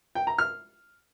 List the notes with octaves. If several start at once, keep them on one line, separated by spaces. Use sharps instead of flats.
G5
A#5
F6